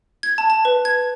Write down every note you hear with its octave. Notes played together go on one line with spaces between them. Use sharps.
G#6
A5
A5
B4
G#6